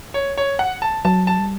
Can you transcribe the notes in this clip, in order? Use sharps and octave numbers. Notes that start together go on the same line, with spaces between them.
C#5
C#5
F#5
A5
F#3 A5
A5
G3